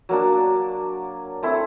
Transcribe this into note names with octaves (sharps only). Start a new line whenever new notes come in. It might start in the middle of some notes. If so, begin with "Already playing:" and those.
F#3 A#3 D4
A3 C4 E4 A4